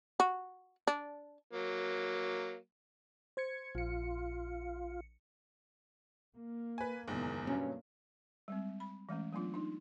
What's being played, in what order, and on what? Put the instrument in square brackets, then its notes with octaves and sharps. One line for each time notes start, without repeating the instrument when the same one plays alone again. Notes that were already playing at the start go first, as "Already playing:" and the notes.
[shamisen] F#4
D4
[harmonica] F#3 A#3
[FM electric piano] C5 G#6 C#7
[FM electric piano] A#1 C#7 [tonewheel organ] F4
[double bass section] A#3
[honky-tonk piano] B4 G#5
[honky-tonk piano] F#1 E2 [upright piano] A#2 D#3 G#3
[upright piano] G2 B2 F#3 [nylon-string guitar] C#4
[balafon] G3 G#3 C4
B5
E3 G#3 A3 C#4
F#3 A3 B3 D4 F4
D4 D#4